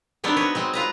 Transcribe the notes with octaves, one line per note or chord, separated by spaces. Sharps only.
F#3 B3 C4 D4 D#4 A#4
F#3 B4 C#5
F#3 G#3 C4
F4 B4 A#5